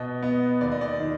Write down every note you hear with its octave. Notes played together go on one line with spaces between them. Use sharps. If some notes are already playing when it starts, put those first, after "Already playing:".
Already playing: B2 D#5
B3 D#5
D#2 D5
D#5
D5
D#3 D#5